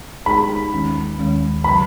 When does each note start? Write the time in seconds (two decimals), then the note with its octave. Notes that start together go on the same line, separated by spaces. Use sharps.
0.26 G#3 D#4 G#4 C#5 B5
0.72 D#2 D#3 G#3 C#4
1.19 D#2 D#3 G#3 C#4
1.64 C#3 F#3 B5